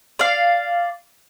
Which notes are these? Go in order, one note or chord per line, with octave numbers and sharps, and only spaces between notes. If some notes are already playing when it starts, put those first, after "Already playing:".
D5 F5